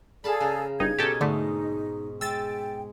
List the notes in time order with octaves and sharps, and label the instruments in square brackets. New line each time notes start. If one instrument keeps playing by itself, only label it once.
[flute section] G#4 A4 D5 [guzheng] F5 A5 B5
[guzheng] C#3 A#4
[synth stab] G1 G2 D#4 [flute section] G#6
[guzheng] B2 C#4 D#4 [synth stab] G4 A4
[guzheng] G#2 [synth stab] D3 A3 [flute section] D#4
[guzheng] G#3 [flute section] G5 [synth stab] E6 A6